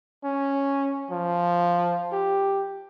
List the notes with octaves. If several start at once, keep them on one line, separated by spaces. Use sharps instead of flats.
C#4
F3
G4